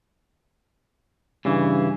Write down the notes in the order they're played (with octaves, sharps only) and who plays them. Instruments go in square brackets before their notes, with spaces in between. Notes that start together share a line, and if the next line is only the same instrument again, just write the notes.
[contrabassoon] G2 [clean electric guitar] C#3 E3